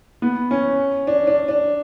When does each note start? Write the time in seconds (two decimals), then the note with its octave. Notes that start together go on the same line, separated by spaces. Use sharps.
0.22 B3
0.51 C#4
1.07 D4
1.27 D4
1.48 D4